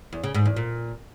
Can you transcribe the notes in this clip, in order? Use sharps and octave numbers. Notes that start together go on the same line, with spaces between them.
E2
C#3
G#2
E2
A#2